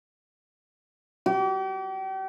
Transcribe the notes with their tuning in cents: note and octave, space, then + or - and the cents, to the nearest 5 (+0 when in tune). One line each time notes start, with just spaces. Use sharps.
G4 -40